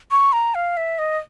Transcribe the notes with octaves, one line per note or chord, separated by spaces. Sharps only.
C#6
A#5
F5
E5
D#5